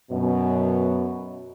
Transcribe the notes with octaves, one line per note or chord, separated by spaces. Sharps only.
F#2 B2